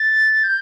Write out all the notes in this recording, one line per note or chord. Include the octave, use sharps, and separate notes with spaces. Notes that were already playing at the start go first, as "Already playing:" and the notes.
Already playing: A6
G6